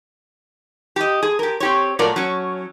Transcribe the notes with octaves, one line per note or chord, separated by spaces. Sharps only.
G4 D#5
G#4
G4 A#4
C4 G4 C#5
A#2 F#3 A3 A#4 D5
F#3 C#4